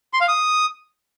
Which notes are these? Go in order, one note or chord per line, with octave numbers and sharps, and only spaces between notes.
C6
F5
D#6